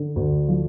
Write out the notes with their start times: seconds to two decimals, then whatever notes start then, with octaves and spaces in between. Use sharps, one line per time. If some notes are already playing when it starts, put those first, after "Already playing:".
Already playing: D3
0.16 D2
0.48 F3